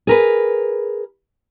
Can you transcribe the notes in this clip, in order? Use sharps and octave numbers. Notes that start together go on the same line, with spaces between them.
G#4 A#4 B4